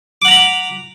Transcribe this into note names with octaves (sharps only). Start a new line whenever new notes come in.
F#5 A#5 B5 D6